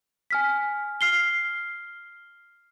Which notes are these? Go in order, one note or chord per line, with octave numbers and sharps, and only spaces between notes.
G#5 F6 B6
F6 C7 G7